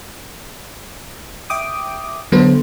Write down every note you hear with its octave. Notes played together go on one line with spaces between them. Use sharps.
E5 G5 D6 D#6
D3 F#3 B3 A4 B4 C5